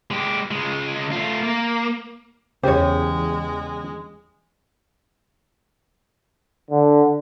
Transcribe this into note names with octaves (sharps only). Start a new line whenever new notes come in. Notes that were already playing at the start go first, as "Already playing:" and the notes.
G#3 G4
C#2 G#3
A3 F4
A#3
E2 C#3 G#3 G4 C5 C#5
D3